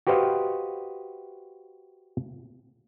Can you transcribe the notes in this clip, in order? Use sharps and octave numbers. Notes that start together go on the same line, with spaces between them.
F#4 G4 B4 C5 D#5 F5